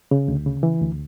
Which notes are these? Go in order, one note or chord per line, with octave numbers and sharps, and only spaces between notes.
C#3
D2
C#3
E3
D2